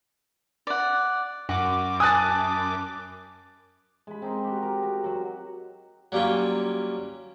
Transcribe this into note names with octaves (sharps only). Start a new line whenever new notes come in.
D5 F#5
F#2 F#4 D6
G#5 A5 D#6 F#6 A6
G#3 B5
C4 D#4 A#4 C6
F#4 G4
A#4
C4 F#4
F#3 F#4
F#3 G3 A#3 C#4 F4